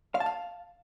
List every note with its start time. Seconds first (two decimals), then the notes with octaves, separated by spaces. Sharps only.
0.15 F5
0.20 A5
0.26 F5